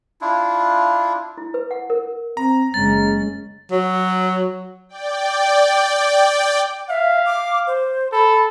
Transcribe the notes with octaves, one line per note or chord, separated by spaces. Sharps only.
D4 E4 F4
E4
B4
F#5
A#4
C4 A#5
F#1 G#3 C#4 A6
F#3
D5 G5
E5 F5
D6
C5
A4 B5